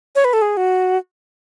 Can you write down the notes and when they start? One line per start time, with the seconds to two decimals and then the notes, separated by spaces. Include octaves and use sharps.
0.15 C#5
0.25 B4
0.33 A4
0.42 G#4
0.57 F#4